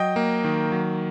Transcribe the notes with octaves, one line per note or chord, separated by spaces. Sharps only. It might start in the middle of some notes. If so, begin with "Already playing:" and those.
Already playing: F#3 D#5 G5
A#3
D#3
F#3